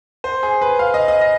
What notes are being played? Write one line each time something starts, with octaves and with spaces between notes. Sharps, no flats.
C5
G#4
B4
F5
D#5
D#5
D#5